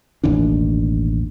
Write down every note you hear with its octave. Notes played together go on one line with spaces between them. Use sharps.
E1 A1 D#2 D4